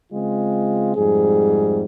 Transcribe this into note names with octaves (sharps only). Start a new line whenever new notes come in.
C#3 G#3 C4 F4
F2 G#2 G3 G#4